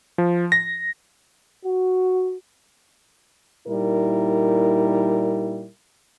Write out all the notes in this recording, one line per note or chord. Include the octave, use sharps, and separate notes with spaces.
F3
A#6
F#4
A#2 G3 D#4 E4 A#4